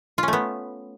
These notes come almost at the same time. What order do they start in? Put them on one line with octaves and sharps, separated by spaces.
F4 C#4 A3 B3